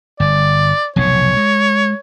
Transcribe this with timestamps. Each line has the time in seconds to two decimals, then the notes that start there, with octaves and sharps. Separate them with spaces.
0.20 G1 D5
0.96 F1 B1 A2 C#5
1.37 G#3